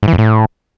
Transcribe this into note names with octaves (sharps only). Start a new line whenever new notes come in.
G#2
E3
F2
A2